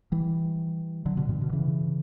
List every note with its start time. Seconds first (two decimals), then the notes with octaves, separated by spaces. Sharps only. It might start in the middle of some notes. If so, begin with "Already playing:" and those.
0.12 E3 G3
1.06 D3 F#3
1.17 B2 D3
1.29 G2 B2
1.41 B2 D3
1.53 C#3 E3